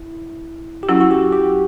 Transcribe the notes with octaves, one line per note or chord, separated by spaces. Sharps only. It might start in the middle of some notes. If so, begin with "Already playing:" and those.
Already playing: E4
G4
F#3 C#4 E4 F#4
F#4
G4
G4